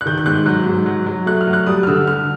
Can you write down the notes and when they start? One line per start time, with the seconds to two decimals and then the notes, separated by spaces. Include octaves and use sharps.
0.01 F#6
0.06 D#3 G6
0.18 G6
0.26 G#2 F#6
0.46 F#3 F#6
0.66 G#2
0.86 F#3
1.06 F#3
1.26 A3 F#6
1.41 F6
1.47 F#3
1.53 F#6
1.67 G3 D#6
1.83 F6
1.87 D3 E6
2.07 D3 F6